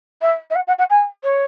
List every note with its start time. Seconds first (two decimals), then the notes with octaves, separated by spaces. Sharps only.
0.21 E5
0.50 E5
0.55 F#5
0.67 F#5
0.78 F#5
0.90 G#5
1.23 C#5